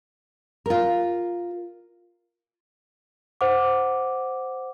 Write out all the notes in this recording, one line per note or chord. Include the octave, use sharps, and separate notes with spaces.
F4 A#4
C5 F#5 D6